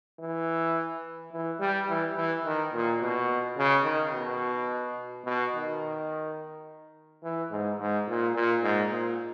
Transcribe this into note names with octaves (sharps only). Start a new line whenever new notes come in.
E3
E3
G3
E3
E3
D#3
A#2
B2
C#3
D#3
B2
B2
D#3
E3
G#2
G#2
A#2
A#2
G#2
A#2